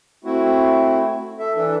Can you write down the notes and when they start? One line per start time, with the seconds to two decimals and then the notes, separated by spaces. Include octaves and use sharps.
0.25 A3 C4 E4 F#4
1.39 A4 E5
1.56 E3 D4 A4